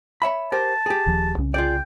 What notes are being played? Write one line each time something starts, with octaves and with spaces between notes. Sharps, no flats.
C#5 E5 B5
G4 A#4 C5 A5
G4 G#4
D#1 D#2 F3
C2 C#3 C#4
F4 G#4 D5 G5